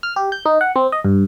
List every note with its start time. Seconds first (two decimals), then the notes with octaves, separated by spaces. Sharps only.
0.03 F6
0.16 G4
0.32 G6
0.46 D#4
0.61 F#5
0.76 C4
0.92 D#5
1.05 G2